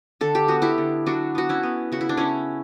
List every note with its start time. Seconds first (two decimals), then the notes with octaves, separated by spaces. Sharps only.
0.21 D3 A4
0.35 G4
0.48 B3 F#4
0.62 E4 G4
0.78 D3
1.06 F#3 D4 F#4
1.35 B3 F#4
1.49 C#4 E4
1.63 B3
1.92 C#3 F#4
2.01 E4
2.09 D4
2.17 C#3 C#4 E4